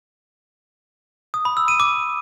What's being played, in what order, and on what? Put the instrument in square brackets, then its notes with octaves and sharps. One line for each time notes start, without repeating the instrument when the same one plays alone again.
[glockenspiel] D#6
B5
E6
D#7
D6